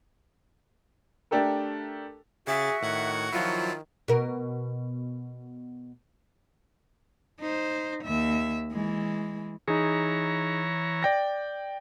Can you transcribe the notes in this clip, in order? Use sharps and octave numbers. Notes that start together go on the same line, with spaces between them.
A3 D4 G4 A4 A#4
C#3 F#4 G#4 E5 A6
A2 D#3 F#5 G#6
D#3 F3 F#3 E4 F4
B2 A#4
D#4 C5
D#2 E5
E3 G#3
E3 D#4 G#4 C#5 A#5
D5 G5 A#6